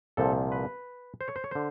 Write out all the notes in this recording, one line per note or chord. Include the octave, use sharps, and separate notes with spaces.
C2 A#2 F3 A4
B4
C5
C#5
C5
C#5
D3 C5